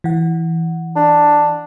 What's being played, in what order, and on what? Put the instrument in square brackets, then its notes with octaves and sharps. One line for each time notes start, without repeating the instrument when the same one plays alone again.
[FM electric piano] E3 F#5
[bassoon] D4